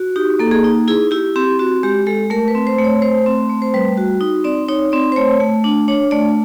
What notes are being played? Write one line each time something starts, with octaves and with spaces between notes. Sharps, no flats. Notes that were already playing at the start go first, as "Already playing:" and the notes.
Already playing: F#4
D#4 G4
A#3 A4
G#4
D#4
E4 G#4
E4 G4
C4 G4
C4 F#4
G#3 G4
G#3 A4
A3 A#4
B4
C4
C5
A3
C#5
A3 C5
C4
A3
C5
G3 B4
F#4
D#4
C4 D5
D#4 C#5
C4 D5
C5
A3 C#5
A3
D4
D4 C#5
A3 D5